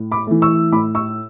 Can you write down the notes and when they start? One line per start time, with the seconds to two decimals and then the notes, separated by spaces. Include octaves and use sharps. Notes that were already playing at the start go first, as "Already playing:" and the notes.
Already playing: A2
0.11 B5 D6
0.27 E3 A3
0.42 C#6 E6
0.72 A2 B5 D6
0.95 C#6 E6